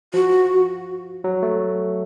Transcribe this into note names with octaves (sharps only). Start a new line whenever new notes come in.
F3 F#4
F#3
A3